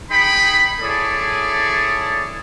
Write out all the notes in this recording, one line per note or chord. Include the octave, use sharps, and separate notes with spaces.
D#4 G#4 G5 B5
E4 G#4 A4 C#5 D5 A5